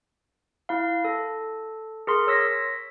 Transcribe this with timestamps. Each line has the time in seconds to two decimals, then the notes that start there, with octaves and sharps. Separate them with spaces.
0.69 E4 F5
1.04 A4
2.07 G#4 A#4 C6
2.27 C#5 E6 A#6 B6